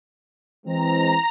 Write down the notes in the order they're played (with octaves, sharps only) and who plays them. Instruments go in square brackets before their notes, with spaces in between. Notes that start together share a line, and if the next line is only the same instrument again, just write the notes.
[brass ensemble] E3 G#3 C4 [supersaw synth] A#5